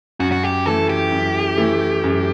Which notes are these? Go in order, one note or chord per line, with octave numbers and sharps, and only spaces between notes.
F#2 F#4
F#4
G4
E3 A3 E4 A4
G4
F#2
E3 A3 E4
F#2